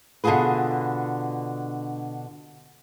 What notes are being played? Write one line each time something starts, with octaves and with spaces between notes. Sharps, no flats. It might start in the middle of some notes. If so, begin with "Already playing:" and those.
B2 D3 D4 F4 G#4 B4